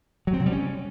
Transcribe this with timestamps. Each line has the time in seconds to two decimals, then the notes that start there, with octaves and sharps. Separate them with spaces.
0.27 F#3
0.33 C4
0.40 C3
0.46 G3
0.52 C#4